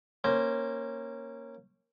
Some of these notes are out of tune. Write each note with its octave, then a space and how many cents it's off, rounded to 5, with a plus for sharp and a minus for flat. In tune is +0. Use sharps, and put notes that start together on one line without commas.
A#3 +0 C#4 -15 C5 +0